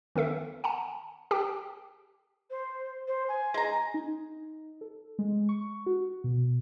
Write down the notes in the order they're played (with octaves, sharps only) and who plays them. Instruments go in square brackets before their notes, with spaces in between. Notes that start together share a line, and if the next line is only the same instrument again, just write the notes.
[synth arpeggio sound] D#3 B3 A4 E5
F#5 G#5 A5
G4 G5
[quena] C5
C5
G#5
[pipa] G#3 A#5
[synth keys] D#4
A4
G#3
C#6
F#4
B2